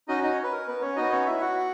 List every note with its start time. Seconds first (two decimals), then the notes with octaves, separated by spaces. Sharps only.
0.08 C#4 D#4 F#4 D#5
0.23 D#4 D#5
0.33 C#5
0.43 B4
0.52 A#4
0.68 B3 B4
0.82 C#4 C#5
0.96 B3 D#4 F#4 D#5
1.12 C#4 C#5
1.26 E4 E5
1.41 F#4 F#5